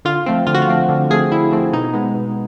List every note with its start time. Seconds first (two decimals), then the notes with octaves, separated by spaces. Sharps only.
0.05 D3 F4
0.26 F3 A3 C4
0.47 D3 F4
0.54 F#4
0.62 F4
0.68 F3 A3 C4
0.89 D3
1.10 F3 A3 C4 G#4
1.31 D3 E4
1.51 F3 A3 C4
1.73 B2 D#4
1.93 G#3 B3
2.15 B2